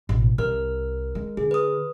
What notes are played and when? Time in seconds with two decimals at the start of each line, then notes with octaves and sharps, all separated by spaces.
0.09 A1 B2
0.38 C2 A#4 F6
1.15 G#3
1.37 D3 G#4
1.51 B4 D#6